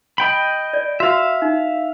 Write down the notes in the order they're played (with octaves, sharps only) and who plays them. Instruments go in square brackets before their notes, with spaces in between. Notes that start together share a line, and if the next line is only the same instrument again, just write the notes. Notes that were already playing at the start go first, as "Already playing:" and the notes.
[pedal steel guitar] D#5 G5 B5
[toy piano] D5
[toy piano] F#4 [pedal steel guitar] E5 F5
[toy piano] D#4